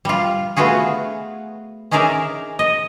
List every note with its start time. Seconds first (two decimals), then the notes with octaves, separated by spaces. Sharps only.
0.05 G3 F4
0.57 A3 B3 F4 F#4 G#4
1.91 C#4 D#4 G#4 A#4 D5 E5
2.59 D#5